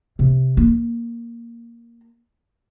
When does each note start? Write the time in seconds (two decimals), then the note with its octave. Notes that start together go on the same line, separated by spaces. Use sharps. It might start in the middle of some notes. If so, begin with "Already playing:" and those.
0.19 C3
0.57 A#3